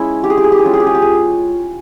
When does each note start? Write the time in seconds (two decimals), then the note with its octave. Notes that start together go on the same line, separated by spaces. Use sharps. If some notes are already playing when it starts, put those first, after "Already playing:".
Already playing: G#3 C#4 E4
0.24 G4
0.30 G#4
0.38 G4
0.44 G#4
0.52 G4
0.59 G#4
0.64 G#3 C#4 F4 G4
0.74 G#4
0.80 G4
0.87 G#4
0.95 G4
1.02 G#4